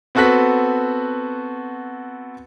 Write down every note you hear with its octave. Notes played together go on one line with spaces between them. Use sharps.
B3 C4 F#4 A4 F#6 B6